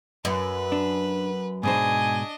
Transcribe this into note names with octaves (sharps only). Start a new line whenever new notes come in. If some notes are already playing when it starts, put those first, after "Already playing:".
F#2 B4
D4
G#2 B2 D4 C5 D#5 G#5